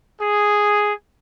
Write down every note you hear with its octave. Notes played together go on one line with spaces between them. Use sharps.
G#4